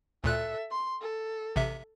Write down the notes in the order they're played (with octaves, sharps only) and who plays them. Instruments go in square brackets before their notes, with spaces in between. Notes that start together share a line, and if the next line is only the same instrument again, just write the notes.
[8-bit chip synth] D2 A#2 F#6 [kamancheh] A4 E5
[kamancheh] C6
A4
[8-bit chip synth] A1 C3 E5